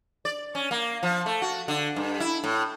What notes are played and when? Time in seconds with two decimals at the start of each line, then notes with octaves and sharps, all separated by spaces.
0.25 D5
0.55 C#4
0.71 A#3
1.03 F3
1.26 A3
1.42 F#4
1.68 D3
1.96 G2
2.20 E4
2.44 A2